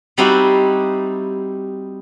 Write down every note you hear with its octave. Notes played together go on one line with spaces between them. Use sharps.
G3 C4 D#4 E4 F#4 G4